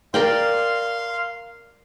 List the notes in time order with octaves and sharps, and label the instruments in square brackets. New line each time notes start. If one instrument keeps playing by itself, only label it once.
[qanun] A#4 D5 G5 [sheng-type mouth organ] F5 C6